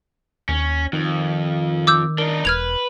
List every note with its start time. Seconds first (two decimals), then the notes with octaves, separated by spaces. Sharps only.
0.49 D#2 C#4
0.93 F2 D#3
1.87 D6 E6 G6
2.18 D4 D#4 A#4
2.45 E1 B4 F6 G#6 F7